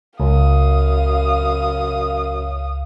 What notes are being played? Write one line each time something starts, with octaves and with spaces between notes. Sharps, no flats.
C#2 F#2 F5 D#6